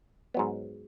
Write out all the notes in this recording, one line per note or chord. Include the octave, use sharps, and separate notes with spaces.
G#2 F#3 B3